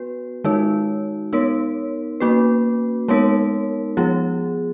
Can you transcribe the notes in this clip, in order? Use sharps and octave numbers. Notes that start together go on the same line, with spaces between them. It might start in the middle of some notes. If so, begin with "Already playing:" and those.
Already playing: B3 F#4 B4
D#3 G#3 D#4 F#4 C#5
B3 D#4 A#4 C#5
A#3 C#4 F#4 B4
G#3 B3 D#4 A#4 C#5
F3 B3 F4 G#4